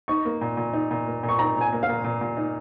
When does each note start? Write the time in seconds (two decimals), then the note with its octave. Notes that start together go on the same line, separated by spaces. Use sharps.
0.08 D#4 C#6
0.25 A#3
0.41 A#2
0.57 A#2
0.73 D#4
0.91 A#2
1.07 A#3
1.23 A#2
1.29 C#6
1.39 D#4 A#5
1.56 A#2 G#5
1.73 A#3
1.83 F5
1.89 A#2
2.04 A#2
2.21 A#2
2.37 D#4